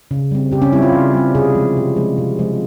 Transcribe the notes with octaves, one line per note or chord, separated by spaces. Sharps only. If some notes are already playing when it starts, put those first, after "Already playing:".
C#3
G3 C4
C#3 G4
C#4
G3 C4 E4
F4
C#3
G3 C4
C3 G#4
F3 G#3
C3
F3 G#3
C3
F3 G#3